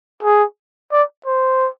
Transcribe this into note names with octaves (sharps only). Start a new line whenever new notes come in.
G#4
D5
C5